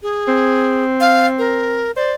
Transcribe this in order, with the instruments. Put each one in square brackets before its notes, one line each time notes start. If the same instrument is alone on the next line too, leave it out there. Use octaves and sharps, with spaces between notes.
[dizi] G#4
[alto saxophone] C4
[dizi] F5
A#4
[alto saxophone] C5 [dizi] D5